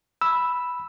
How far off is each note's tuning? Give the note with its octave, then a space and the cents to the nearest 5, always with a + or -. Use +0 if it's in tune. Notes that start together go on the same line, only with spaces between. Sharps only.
B5 +0 E6 +0